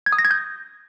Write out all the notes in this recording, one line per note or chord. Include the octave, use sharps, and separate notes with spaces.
G#6
D#6
A#6
G#6
G6